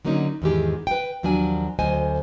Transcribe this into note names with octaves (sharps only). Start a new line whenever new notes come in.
D3 F#3 A#3 C#4 D#4
E2 G#2 D#3 E3 G4 G#4
B4 G5
D#2 F3 F#3 D4 G#5
D2 F#3 C5 D#5 G#5